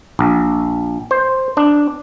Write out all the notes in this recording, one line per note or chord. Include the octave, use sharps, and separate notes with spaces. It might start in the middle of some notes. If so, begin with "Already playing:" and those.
A#1
C5
D4